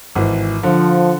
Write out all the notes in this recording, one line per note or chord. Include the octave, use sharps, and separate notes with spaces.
G#1 E3
D3 F3